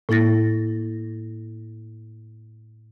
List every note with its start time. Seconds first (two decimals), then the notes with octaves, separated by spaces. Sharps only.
0.09 A2 A#3 E4 A6 A#6